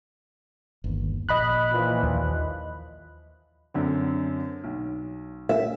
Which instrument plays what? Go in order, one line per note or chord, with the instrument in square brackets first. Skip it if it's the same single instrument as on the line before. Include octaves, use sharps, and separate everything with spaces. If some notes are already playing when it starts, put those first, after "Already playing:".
[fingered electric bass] G1 D#2
[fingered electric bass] A#1 [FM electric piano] D#5 B5 F#6
[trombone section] A#2 E3 F3
[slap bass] D#2
[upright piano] F#2 D3 C4
B1
[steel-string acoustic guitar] E5